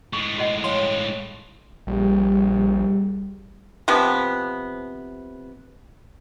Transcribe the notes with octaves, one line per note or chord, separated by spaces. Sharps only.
A2 G#3 C#6
F#4 D#5 F#5
C#5 F5 G5 C6
A#1 G3 G4 G#4
C3 F3 B3